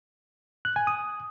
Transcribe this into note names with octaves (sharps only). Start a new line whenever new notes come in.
F#6
G#5
D#6